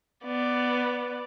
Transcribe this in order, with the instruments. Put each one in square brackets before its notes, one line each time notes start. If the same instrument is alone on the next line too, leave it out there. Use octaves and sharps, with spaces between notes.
[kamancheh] B3 D5